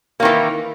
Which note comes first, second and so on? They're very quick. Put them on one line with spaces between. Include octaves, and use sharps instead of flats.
A#3 D#3 E3